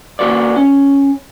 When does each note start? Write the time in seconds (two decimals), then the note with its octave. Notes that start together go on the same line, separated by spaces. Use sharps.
0.19 A#3 F#4 B4 D5
0.56 C#4